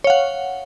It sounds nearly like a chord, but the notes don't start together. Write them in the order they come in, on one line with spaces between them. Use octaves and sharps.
C#5 F5 F#5